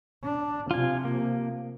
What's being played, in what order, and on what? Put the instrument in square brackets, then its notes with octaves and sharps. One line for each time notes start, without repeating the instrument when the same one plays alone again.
[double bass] D4
[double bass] C3 F3 [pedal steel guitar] F4 G#5
[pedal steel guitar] A#3